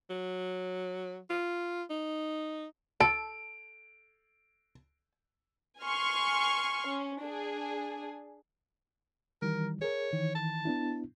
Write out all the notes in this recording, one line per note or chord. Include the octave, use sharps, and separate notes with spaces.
F#3
F4
D#4
A4 D7
G#5 C6 C#6 F6
C#4
D4 G#4
D#3 E3 G3 A#4
G#4 A#4 C#5
D#3 E3
A5
B3 D4 E4